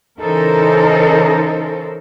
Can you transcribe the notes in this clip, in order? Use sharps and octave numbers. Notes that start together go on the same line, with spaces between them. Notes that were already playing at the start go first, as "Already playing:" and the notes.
C#3 E3 D#4 A4 A#4 C5